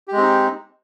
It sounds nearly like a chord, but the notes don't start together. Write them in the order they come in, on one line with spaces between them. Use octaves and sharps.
G4 G#3 C4 D#4